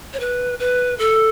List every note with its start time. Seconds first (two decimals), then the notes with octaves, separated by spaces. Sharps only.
0.13 C#5
0.20 B4
0.59 B4
0.99 A4